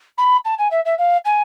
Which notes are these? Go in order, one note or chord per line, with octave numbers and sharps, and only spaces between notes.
B5
A5
G#5
E5
E5
F5
G#5